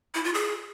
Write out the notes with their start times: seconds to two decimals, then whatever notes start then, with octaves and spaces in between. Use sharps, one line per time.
0.15 E4
0.24 F4
0.34 G#4